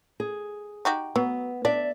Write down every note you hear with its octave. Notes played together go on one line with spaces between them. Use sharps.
G#4
D#4 F#4 G4
F#3 B3
D4 D5 E5